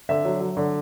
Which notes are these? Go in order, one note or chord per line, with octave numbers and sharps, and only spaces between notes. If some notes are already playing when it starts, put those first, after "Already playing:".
D3 E5
F#3
F#3
D3